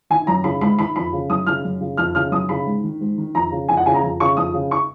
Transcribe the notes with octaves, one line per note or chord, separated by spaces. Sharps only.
D#3 G#5
F#2 A#5
C#3 B5
G#2 B5
D#3 B5
F2 B5
C#3
F#2 D#6
C#3 F6
F#2
C#3
F2 F6
C#3 F6
F#2 D#6
C#3 B5
G#2
D#3
G#2
D#3
F2 A#5
C#3
F2 G#5
F#5
C#3 G#5
A#5
F2
C#3 C#6
F2 D#6
C#3
C#6